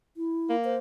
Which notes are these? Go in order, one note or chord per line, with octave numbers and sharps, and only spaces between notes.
E4
A#3
C5